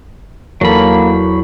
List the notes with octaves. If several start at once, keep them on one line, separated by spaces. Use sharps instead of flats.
E2 F#3 A#3 A4 B5